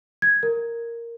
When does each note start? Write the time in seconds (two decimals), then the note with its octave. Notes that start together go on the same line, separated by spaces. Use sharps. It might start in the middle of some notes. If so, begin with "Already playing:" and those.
0.22 G#6
0.43 A#4